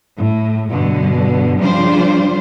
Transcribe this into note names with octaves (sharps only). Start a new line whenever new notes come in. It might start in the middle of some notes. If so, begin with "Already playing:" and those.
A2
G2 B2 D3
C#3 F3 G3 D4 F4 C5